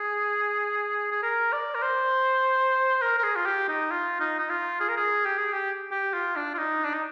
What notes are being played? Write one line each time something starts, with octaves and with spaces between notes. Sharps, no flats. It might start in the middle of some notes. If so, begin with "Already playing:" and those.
Already playing: G#4
G#4
A#4
D5
A#4
C5
A#4
A#4
G#4
F4
G4
D#4
F4
D#4
D#4
F4
G#4
A#4
G#4
G4
G#4
G4
G4
F4
D4
F4
D#4
D4
D#4